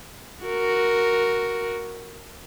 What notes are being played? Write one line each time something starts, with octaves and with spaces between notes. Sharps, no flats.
F#4 A#4